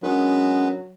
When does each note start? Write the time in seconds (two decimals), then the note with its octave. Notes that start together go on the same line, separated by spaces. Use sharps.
0.03 F#3 G#3 B3 C#4 D4 A#4 B4